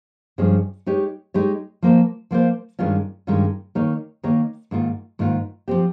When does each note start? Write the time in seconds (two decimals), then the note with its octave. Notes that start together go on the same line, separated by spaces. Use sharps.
0.38 G2 F3 G#3 C#4 G#4
0.86 G#3 D#4 G4 C#5
1.34 G#3 D#4 G4 C#5
1.82 F3 A#3 F4 C5
2.31 F3 A#3 F4 C5
2.79 G2 D#3 G#3 C#4 F4
3.27 G2 D#3 G#3 C#4 F4
3.75 D#3 A#3 D#4 A#4 C#5
4.23 D#3 A#3 D#4 A#4 C#5
4.71 G#2 D#3 A#3 F4
5.19 G#2 D#3 A#3 F4
5.68 F3 C4 G4